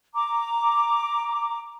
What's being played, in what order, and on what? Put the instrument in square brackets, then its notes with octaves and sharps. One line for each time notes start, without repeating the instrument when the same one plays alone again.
[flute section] A#5 D6